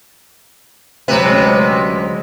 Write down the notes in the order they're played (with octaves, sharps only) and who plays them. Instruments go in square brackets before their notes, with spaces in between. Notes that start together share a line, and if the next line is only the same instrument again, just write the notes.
[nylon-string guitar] D2 F#3 [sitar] C3 B4
[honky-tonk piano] G#3 C#4